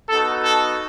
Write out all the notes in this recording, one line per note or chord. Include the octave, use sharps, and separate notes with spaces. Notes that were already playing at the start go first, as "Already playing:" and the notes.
B3 D#4 F#4 A4
A4